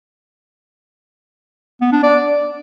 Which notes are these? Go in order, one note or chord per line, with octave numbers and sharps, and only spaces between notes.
B3
D4
D5